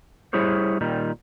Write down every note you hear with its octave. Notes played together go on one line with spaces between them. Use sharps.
G3 E4 G#4 C5 C#5
A#2 D#3 G3